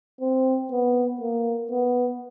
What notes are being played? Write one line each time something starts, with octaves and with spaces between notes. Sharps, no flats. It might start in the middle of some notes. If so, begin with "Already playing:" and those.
C4
B3
A#3
B3